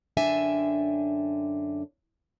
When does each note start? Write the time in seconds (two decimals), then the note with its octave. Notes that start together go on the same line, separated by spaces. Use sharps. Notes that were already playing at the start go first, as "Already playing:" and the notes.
0.17 F#2 D3 D4 E5 G5 G#5